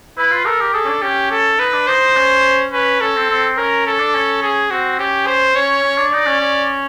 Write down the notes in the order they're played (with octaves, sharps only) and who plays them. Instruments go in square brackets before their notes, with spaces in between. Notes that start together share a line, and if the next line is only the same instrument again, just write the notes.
[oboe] E4 [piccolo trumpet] B4
[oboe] F4
[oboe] A4 [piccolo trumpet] A#4
[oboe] G4
[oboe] G#4 [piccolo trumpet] A4
[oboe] C#4
D4
[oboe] C#4 [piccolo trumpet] G4
[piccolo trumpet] A4
[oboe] D#4 [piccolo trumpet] B4
[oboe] D4
[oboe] D#4 [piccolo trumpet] C5
[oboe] C#4
[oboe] C#4 [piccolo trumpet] B4
[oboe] C#4 [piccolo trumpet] A4
[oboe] C4
C4
[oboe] C#4 [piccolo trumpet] A#4
[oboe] C#4 [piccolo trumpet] A4
[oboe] D4
C#4
[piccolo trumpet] G#4
[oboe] C4 [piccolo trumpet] F#4
[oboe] C#4 [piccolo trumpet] G4
[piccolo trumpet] C5
[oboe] C#4 [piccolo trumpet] C#5
[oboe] C#4
D4
[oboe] D#4 [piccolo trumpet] D5
[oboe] C#4
C#4